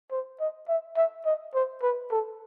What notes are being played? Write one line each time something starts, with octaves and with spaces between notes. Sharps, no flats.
C5
D#5
E5
E5
D#5
C5
B4
A4